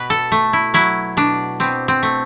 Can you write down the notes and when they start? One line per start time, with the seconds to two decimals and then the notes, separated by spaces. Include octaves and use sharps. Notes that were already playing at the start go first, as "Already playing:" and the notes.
Already playing: B2 B4
0.10 A4
0.32 A3
0.53 E4
0.74 F#3 E4
1.17 B2 D4
1.60 B2 C4
1.88 C4
2.03 A3